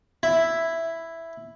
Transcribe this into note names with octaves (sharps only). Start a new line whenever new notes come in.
E4